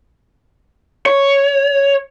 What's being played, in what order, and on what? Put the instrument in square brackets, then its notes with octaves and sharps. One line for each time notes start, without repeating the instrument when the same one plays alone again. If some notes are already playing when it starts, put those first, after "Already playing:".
[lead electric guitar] C#5